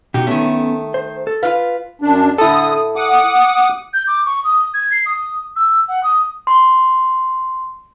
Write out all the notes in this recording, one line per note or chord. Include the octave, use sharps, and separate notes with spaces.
B2 D#4 F#4 G4
D#3 A3 B3 C#4
C5
A4
F4 B4 F5
F#2 D4
D3 E4 A4 D#6
F#5 D6 D#6
G6
D6
C#6
D#6
G#6
C7
D#6
E6
F#5
D#6
C6